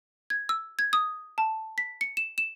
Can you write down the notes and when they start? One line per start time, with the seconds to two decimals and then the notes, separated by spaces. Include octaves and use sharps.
0.30 G#6
0.49 E6
0.79 G#6
0.93 D#6
1.38 A5
1.78 B6
2.01 C#7
2.17 E7
2.38 E7